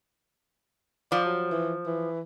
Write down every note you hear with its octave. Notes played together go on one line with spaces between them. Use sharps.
F3 D5
F#3
E3
E3